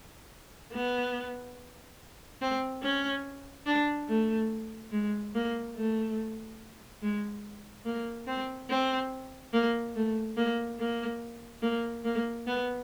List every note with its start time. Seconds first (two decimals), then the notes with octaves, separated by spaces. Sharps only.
0.73 B3
2.41 C4
2.83 C#4
3.66 D4
4.08 A3
4.92 G#3
5.35 A#3
5.76 A3
7.02 G#3
7.86 A#3
8.27 C4
8.69 C4
9.53 A#3
9.95 A3
10.37 A#3
10.79 A#3
11.62 A#3
12.05 A#3
12.47 B3